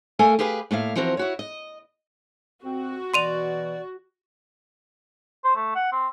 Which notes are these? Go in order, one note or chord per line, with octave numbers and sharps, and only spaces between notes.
A3 A4 A#4 F5 G#5
G4 G#4 B4 F5 G#5
A2 A#3 E5 F5
E3 F3 C4 F#4 A#4
E4 F#4 C#5
D#5
F2 C4 F#4
B2 E3 D5 C6 D#7 F7
C5
A3
F#5
C4